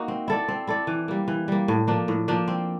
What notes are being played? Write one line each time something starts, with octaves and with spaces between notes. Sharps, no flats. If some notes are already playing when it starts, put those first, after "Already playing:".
Already playing: A#3 D#4 F#4
C4
E4 A4 D5
C4
E4 A4 D5
E3
G3 A#3
E3
G3 A#3
A2
F3 A#3 D4
A2
F3 A#3 D4
C4